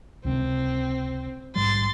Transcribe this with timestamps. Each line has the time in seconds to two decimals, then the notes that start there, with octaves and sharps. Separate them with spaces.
0.25 C#2 C3 C4 C#4
1.56 A#1 G#2 G3 C6 A6